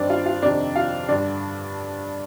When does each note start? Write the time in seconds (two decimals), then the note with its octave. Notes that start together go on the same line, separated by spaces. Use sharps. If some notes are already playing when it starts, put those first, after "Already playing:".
Already playing: G2 D#3 C4 D4 D5
0.10 F4 F5
0.26 F4 F5
0.42 F2 C3 D#3 D4 D5
0.76 F4 F5
1.08 G2 D3 D4 D5